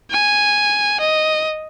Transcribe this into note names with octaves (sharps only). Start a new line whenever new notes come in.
G#5
D#5